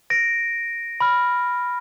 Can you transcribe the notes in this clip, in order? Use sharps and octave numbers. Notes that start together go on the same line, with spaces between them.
A#6 D7
B5 F6